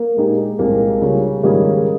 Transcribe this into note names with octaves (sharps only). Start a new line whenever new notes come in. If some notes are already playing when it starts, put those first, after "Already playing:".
Already playing: A#3
A#2 G#3 D#4 G4
C2 A#2 G#3 A#3 C4
C#3 G3 C#4 F4
G#2 D#3 G3 A#3 C#4 G#4